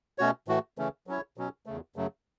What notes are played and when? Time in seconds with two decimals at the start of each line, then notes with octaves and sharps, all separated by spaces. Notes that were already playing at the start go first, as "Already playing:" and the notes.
0.18 B2 A3 C#4 F#4 C#5
0.48 A2 E3 A3 F#4
0.78 C#3 E3 A3 C#4
1.07 F#3 C#4 E4 C#5
1.37 B2 F#3 C#4
1.66 E2 C#3 A3
1.96 F#2 C#3 F#3 A3